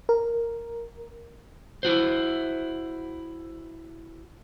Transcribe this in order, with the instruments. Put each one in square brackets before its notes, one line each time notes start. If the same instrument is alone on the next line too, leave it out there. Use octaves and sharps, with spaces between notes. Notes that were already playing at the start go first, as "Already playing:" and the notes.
[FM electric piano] A#4
[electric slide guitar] E4 F#4 C5